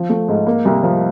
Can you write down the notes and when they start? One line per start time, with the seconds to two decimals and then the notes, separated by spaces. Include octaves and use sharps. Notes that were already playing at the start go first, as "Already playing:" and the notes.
Already playing: F3
0.09 A3
0.28 G#2
0.46 A#3
0.65 C2
0.83 F3